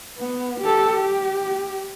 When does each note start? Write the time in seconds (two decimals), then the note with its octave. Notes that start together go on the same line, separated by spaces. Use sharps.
0.18 B3
0.60 G4 A4
0.94 G4